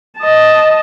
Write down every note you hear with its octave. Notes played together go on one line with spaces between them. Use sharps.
D#5 A5